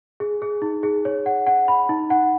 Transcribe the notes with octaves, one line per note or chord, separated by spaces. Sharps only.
G#4
G#4
D#4
G#4
C#5
F#5
F#5
B5
D#4
F#5